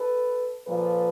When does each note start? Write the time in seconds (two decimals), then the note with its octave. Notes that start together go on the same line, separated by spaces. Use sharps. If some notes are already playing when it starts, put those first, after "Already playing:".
Already playing: A4 B4
0.67 A#2 F3 A4 B4